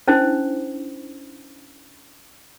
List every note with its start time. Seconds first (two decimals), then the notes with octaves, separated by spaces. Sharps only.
0.08 C#4 D4 E4 C5